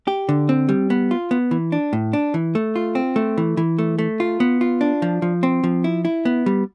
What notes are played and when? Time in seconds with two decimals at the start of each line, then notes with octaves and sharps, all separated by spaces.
0.08 G4
0.29 D3
0.49 C4
0.69 G3
0.90 B3
1.11 F4
1.31 B3
1.51 E3
1.72 D4
1.93 A2
2.13 D4
2.34 E3
2.55 A3
2.76 F4
2.95 C4
3.16 A3
3.38 E3
3.57 E3
3.79 A3
3.99 A3
4.20 F4
4.40 B3
4.61 F4
4.81 D4
5.02 F3
5.22 F3
5.43 C4
5.64 F3
5.84 E4
6.05 E4
6.25 B3
6.46 G3